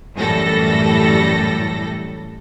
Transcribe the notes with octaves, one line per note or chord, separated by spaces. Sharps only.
F#2 A2 E3 G3 A4 A#6